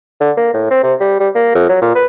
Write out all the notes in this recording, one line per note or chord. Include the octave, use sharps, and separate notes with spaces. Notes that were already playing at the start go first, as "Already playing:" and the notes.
D3
A#3
A2
C4
C3
G3
G3
A#3
F2
F#3
A#2
B4